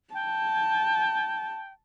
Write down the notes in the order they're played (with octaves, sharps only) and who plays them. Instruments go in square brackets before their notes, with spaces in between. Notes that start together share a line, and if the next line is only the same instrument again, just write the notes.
[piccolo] G5 [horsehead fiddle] A5